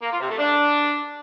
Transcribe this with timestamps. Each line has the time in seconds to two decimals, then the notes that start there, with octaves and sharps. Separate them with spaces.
0.02 A#3
0.11 F4
0.21 C3
0.30 A3
0.39 D4